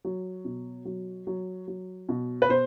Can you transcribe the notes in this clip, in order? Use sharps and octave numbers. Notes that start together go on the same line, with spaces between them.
F#3
B2
F#3
F#3
F#3
B2
B4
B2 C5